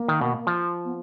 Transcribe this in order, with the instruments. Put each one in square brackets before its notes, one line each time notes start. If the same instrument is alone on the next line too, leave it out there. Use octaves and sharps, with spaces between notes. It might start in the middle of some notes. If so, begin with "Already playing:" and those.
Already playing: [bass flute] A#3
[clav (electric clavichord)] D#3
B2
F3
[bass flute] B3